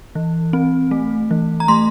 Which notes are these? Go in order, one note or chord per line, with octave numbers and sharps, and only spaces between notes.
E3
C4
A3
E3
A#5
A3 C6